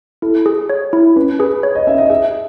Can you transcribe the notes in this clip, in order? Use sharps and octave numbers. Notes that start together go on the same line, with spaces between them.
E4 A4
G#4
C#5
E4
C#4 B4
G#4 B4
C#5
D#5
C#4 E5
D#5
G#4 E5